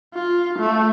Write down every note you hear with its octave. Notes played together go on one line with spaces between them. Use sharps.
F4
A3